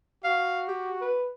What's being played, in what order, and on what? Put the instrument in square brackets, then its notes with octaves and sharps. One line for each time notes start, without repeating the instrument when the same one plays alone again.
[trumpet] F#4 [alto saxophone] F5
[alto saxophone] G4
B4